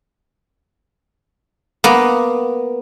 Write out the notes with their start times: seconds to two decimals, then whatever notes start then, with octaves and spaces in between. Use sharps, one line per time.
1.84 A#3 B3